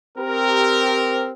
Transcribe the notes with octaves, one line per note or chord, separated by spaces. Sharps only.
C4 G4 A#4